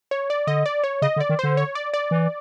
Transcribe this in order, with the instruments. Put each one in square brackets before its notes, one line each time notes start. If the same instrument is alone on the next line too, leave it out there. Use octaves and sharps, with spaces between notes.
[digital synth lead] C#5
D5
[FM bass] D3 [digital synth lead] D#5
[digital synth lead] D5
C#5
[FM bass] C#3 [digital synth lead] D#5
[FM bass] D3
[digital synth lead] D5
[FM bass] D#3
[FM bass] D3 [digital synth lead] C5
[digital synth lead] C#5
D5
D5
[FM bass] E3